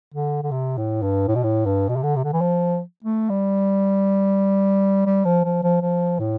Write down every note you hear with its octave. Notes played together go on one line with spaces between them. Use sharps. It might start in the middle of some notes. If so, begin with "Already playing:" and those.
D3
D3
C3
A2
G2
A2
B2
A2
G2
B2
C3
D3
C3
D3
E3
F3
A3
G3
G3
F3
F3
F3
F3
A2